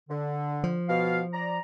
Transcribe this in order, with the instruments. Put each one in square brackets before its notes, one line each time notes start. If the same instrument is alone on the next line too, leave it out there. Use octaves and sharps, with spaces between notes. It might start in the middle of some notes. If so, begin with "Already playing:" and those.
[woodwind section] D3
[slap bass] F3
[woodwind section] B2 F5
D5 A#5